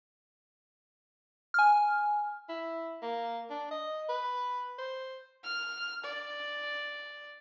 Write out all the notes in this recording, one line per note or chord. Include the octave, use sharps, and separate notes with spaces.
G#5 F6
E4
A#3
D4
D#5
B4
C5
F6
D5